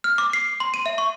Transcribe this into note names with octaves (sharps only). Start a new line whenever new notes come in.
F6
D6
C7
C6
D#7
E5
C#6